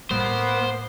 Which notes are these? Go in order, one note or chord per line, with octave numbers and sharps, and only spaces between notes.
A2 G3 A#3 B3 C5